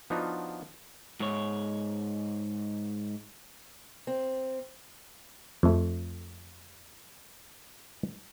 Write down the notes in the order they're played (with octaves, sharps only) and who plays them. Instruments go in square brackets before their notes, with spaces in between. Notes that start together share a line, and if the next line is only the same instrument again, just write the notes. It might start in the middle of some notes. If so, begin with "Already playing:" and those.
[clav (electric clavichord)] F3 B3 D4 D#4 F4 F#4
[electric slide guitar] G#2 C#5
[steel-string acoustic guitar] C4
[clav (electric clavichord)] F2 A3